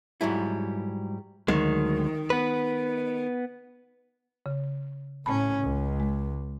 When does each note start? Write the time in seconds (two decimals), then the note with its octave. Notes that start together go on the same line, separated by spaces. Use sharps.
0.21 G#2 F#3 G3 E4
1.48 D2 D#3 F#3 G#3
2.30 B3 B4
4.46 C#3
5.26 A2 C#4 A5 B5
5.61 C#2
6.00 G#3